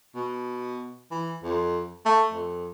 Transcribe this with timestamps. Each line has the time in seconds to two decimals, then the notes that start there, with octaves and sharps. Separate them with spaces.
0.15 B2
1.11 E3
1.43 F2
2.05 A3
2.32 F2